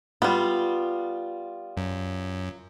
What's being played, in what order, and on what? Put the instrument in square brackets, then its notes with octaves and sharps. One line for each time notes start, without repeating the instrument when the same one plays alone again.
[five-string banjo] G3 B3 [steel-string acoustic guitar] F4
[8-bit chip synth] F#2